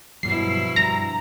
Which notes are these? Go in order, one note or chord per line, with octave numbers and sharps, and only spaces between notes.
G2 B2 F3 F#3 E4 C7
G2 A#5